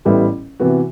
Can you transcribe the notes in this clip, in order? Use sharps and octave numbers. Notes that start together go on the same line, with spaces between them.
A1 A2 G3 B3 E4
C3 E3 B3 F#4